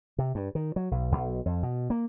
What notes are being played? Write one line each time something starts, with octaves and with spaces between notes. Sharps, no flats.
C3
G2
D#3
F#3
B1
B1
F2
B2
A#3